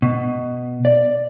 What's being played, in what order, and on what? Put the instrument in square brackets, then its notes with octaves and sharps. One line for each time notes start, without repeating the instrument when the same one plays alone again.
[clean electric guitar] B2
D5